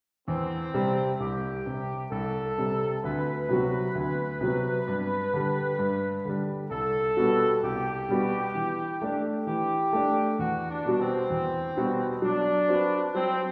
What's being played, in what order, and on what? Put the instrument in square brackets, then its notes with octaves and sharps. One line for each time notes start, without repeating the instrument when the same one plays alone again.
[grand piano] E2 [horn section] C4
[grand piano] C3 G3
[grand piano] C2 [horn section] G4
[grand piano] C3 G3
[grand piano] C2 [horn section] A4
[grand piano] C3 G3
[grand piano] D2 [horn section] B4
[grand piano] C3 F#3 B3 F#4
D2
C3 F#3 B3 F#4
G2
D3 G3
G2
D3 G3
[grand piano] C2 [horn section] A4
[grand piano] B2 G3 B3 F#4
[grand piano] C2 [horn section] G4
[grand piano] B2 G3 B3 F#4
E3
A3 D4
[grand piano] E3 [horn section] G4
[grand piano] A3 D4
[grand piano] E2 [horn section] F#4
[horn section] D4
[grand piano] B2 G3 B3 F#4
[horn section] C4
[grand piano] E2
B2 G3 B3 F#4
[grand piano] F#3 [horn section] D4
[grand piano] C4 F#4 B4
[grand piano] F#3 [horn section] C4